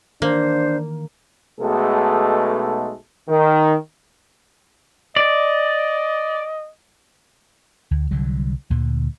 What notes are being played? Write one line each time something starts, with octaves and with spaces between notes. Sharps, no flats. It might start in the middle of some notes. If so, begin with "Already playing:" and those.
D#3 E3 A#3 D4 C5
B1 B2 G#3 A3 G#4 A4
D#3
D5 D#5
D2
C2 D3 F#3 G3
D2 A#2 D3